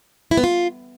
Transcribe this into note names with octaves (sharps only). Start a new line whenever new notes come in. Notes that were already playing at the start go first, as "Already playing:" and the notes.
E4
B3
F4